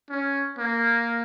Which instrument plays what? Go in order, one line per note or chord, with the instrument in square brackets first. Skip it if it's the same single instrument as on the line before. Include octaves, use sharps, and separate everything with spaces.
[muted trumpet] C#4
A#3